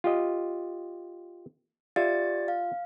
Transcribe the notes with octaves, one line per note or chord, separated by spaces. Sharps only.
F4 G4 D#5
F4 G4 D5 E5 A6
F5